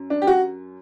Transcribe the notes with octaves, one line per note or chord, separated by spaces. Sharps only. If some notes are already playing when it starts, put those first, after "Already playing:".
Already playing: F#2
D4
G4
F#4